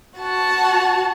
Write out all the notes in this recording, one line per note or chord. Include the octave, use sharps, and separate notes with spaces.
F#4 A5